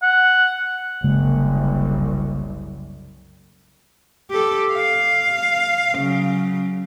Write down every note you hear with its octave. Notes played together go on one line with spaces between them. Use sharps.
F#5
F#1 C2 C#3 G#3 A#3
G4 A4
F5
C#3 F#3